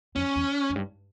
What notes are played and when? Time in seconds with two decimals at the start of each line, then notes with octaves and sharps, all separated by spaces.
0.16 F2 C#4
0.36 E2
0.70 F2
0.76 G2